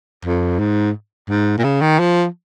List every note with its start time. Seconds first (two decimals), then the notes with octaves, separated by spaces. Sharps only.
0.25 F2
0.59 G#2
1.30 G#2
1.58 A#2
1.64 C#3
1.82 D#3
1.99 F3